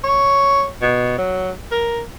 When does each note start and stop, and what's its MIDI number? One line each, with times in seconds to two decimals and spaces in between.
0.04 0.68 73
0.82 1.17 47
1.18 1.51 54
1.72 2.01 70